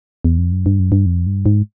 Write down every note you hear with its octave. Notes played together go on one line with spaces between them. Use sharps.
E2
F2
F#2
G2
F#2
G2
F2
G2
G#2